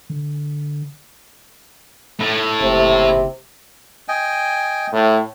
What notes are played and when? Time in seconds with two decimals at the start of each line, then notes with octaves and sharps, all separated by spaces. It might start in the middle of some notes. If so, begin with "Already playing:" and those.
0.10 D3
2.20 A2
2.60 F#1 C3
4.08 D#5 G5 G#5
4.93 A2